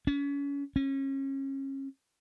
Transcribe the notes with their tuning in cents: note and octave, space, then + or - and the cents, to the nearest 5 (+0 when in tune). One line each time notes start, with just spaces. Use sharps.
C#4 +30
C#4 -30